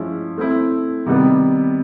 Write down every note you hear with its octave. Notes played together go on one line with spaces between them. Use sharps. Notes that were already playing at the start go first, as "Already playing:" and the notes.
Already playing: F3 G#3 C#4 E4
A3 C4 E4
C3 D#3 G3 B3